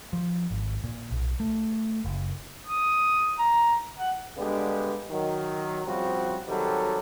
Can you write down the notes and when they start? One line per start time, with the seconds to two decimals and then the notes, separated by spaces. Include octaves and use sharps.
0.13 F3
0.51 G#1
0.84 A#2
1.11 B1
1.40 A3
2.05 F#1
2.67 D#6
3.39 A#5
3.99 F#5
4.37 G2 D3 G#3 B3 G4
5.10 D#3 F#3
5.86 C#3 F3 G3 C4 F#4
6.47 C3 D#3 F#3 G3 A4